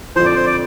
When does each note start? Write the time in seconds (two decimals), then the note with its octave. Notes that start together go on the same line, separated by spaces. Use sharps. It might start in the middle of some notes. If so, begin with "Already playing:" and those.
0.16 F2 D3 F3 C5
0.26 D5
0.36 C5
0.46 D5